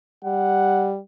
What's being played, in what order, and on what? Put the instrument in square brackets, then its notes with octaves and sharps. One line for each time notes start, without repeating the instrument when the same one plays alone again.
[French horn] G3 [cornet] F#5